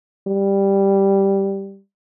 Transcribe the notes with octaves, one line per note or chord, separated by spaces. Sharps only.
G3